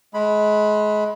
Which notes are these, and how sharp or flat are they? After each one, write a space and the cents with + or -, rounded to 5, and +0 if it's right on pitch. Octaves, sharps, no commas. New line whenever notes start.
G#3 +30 B5 +0